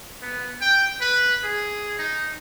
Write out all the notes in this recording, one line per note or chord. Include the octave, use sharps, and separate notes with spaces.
B3
G5
B4
G#4
D#4